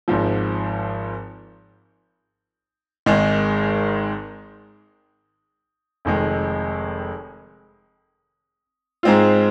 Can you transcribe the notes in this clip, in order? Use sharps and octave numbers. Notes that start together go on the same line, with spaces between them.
G#1 G#2 F3
G#1 G#2 D#3 G#3
F1 F2 D#3 G#3
G#2 G#3 C4 F4